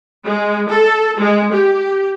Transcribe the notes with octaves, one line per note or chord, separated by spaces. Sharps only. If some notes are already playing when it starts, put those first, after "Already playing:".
G#3
A4
G#3
G4